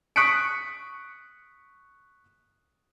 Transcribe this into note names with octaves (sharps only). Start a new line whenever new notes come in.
C#6 D#6 F#6 B6 C#7 D7